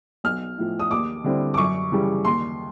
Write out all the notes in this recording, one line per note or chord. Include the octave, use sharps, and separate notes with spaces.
B1 F6
A2 F3
D#6
D#2 D6
D3 G3 C4 E4
D6
F#2 C#6
C#3 E3 G3
D#2 C6